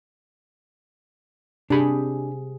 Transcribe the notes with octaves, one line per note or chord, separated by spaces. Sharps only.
C3 D4 G4 G#4 B5